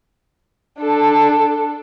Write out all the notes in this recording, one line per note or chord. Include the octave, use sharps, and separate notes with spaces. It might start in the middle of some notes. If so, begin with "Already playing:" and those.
D4 A4